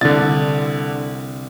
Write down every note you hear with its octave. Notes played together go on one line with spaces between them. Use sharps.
C2 D3 A6